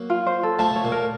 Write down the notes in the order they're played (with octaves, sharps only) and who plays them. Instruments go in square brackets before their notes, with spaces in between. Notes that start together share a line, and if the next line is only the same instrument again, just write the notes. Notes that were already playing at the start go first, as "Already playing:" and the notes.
Already playing: [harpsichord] F#3 A#3
[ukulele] F4
C5
A4
[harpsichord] F3 A3 [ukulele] A5
[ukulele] C#5
[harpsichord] A#2
[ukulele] A#4